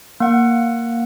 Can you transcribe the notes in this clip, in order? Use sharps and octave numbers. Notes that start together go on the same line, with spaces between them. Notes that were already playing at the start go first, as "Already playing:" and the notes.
A#3 F#5